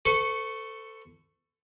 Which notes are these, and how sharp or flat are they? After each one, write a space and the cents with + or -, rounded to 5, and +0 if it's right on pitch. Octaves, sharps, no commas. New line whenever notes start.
A4 +15 C5 -45 C#6 -5